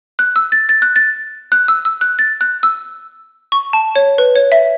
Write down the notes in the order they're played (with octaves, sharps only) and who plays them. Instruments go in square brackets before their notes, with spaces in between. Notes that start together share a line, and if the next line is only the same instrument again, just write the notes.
[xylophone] F#6
E6
A6
A6
F#6
A6
F#6
E6
E6
F#6
A6
F#6
E6
C#6
A5
C#5
B4
C#5
E5